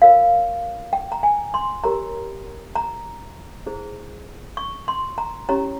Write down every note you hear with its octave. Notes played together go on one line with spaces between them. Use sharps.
F4 A#4 C#5 F5
G5
A#5
G#5
C6
G4 A#4 C#5 A#5
A#5
E4 G#4 C5
C#6
C6
A#5
C#4 E4 G4 C#5 A#5